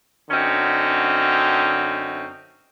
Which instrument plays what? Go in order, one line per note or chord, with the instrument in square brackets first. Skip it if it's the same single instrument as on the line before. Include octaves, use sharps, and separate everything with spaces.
[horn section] F#2 D3 C4 C#4 D#4